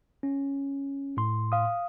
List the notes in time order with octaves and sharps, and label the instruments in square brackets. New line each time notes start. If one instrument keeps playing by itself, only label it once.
[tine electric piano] C#4
A2 C6
[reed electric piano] F5 D#6